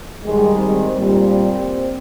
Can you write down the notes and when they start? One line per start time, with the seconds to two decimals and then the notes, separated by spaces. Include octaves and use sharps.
0.24 G#2 D#3 G3 G#3
0.58 C4
0.91 A#2 G3 C4